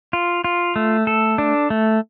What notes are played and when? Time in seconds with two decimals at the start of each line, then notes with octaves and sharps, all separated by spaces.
0.13 F4
0.44 F4
0.76 A3
1.07 A4
1.38 D4
1.70 A3